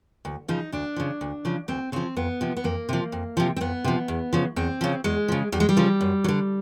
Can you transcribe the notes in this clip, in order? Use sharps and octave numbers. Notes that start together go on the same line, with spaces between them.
D2
C#3 F3 D#4
D2 D4
C#3 F3
D2
C#3 F3
D2 C4
C#3 F3 C4
F2 B3
C3 F3
B3
F2 A#3
C3 F3
F2
C3 F3
C4
F2 B3
C3 F3
E2
C#3 F3
E2 C4
C#3 F3
E2 G#3
C#3 F3
E2 G3
G#3
G3
C#3 F3
F#2
F#3
D3